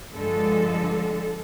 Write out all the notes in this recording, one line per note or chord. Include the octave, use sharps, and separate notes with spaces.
G2 D3 F3 G#3 A4